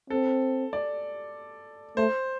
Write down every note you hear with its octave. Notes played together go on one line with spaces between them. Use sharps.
C4 A4
D5
A3 C5